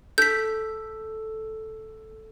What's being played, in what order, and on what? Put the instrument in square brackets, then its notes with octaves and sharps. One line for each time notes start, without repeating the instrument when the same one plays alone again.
[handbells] A4 [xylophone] G6 B6